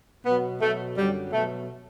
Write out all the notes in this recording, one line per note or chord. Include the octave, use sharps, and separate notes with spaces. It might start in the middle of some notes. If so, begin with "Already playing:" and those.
B2 F#3 B3
B2 F#3 A3
F#2 D3 F#3 G3
B2 F#3 A3